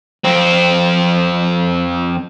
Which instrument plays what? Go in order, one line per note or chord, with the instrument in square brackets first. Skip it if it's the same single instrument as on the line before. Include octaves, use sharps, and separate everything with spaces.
[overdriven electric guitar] F2 C4